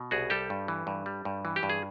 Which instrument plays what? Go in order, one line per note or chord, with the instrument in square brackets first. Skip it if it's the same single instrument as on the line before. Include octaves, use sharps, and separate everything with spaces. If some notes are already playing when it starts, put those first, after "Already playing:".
Already playing: [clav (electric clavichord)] B2
C2 F#4 G#4
G3 G4 A4
G2
E3
G2
G3
G2
E3
G4
G2
G#4